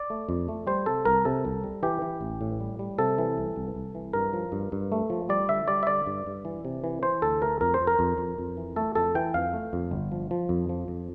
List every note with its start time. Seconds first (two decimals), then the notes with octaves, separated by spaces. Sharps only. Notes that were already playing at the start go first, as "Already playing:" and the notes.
Already playing: D5
0.10 A3
0.29 F2
0.48 A3
0.67 G3 C5
0.86 C3 A4
1.05 C2 A#4
1.25 C3 A4
1.45 C2
1.64 G3
1.83 E3 G4
2.02 E3
2.21 A1
2.41 A2
2.60 G3
2.79 G3
2.98 C3 A4
3.18 E3
3.38 C2
3.56 C2
3.75 C2
3.95 E3
4.13 G2 A#4
4.33 F3
4.52 G2
4.72 G2
4.92 A3
5.10 F3
5.29 G3 D5
5.49 D3 E5
5.68 G3 D5
5.83 E5
5.87 D3 D5
6.06 G2
6.27 G2
6.45 E3
6.65 C3
6.84 E3
7.03 E3 C5
7.22 D2 A4
7.41 A3 A#4
7.61 F2 A#4
7.74 C5
7.81 F2
7.87 A#4
7.99 F2
8.18 F2
8.38 F2
8.57 E3
8.76 A3 A4
8.95 F2 A4
9.15 E3 G5
9.34 F2 F5
9.54 A3
9.73 F2
9.91 G1
10.12 F3
10.31 F3
10.49 F2
10.69 F3
10.88 F2